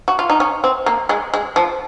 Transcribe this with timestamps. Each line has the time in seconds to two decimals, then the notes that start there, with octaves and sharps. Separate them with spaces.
0.08 F#4
0.19 F4
0.30 D#4
0.40 C#4
0.64 C4
0.86 A#3
1.09 G#3
1.34 G#3
1.56 F3